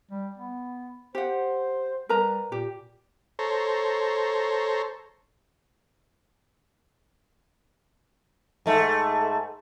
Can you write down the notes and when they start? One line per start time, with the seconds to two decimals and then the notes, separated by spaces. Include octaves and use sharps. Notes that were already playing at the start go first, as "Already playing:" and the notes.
0.11 G3
0.38 B3
1.15 G4 C5 F#5
2.09 G3 A#4 B4 A#5
2.52 A#2 G4
3.39 A4 C5 C#5 A#5
8.66 G#2 A3